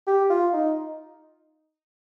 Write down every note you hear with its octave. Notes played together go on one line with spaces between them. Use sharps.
G4
F4
D#4